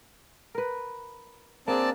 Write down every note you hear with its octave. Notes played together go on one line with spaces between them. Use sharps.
A#4 B4
A#3 C4 D4 G#4 D5 A5